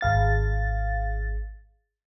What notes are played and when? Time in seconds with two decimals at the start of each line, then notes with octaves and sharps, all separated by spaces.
0.01 G#1 F5 A6